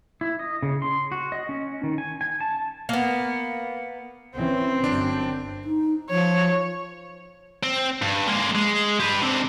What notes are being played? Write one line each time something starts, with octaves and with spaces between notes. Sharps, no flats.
E4
D#5
C#3
C6
F#4
D#5
C#4
D#3
G#5
G#5
A5
A#3 B3
E3 C4 C#4
G1 F#2 D4
D#4
F3 C#5
C4
G2
G#3 A#3
G#3
G4 B4
D3 C4